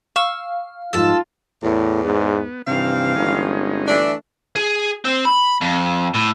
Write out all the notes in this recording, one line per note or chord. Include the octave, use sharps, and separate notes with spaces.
F5 C#6 E6
G#2 F3 G3 F4 A4 A5
E2 A2
G#2 B3
G2 C3 D#3 E3 C4 F5
G1 G#3 C#4 D#4
E3 A3 D4
G#4
C4
B5
F2
A2